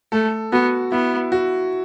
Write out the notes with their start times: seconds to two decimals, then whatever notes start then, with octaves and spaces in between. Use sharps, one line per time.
0.12 A3 A4
0.52 B3 F#4
0.92 B3 E4
1.32 F#4